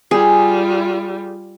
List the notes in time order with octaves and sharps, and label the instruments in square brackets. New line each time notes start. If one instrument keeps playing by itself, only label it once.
[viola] G3 F4 [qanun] G#4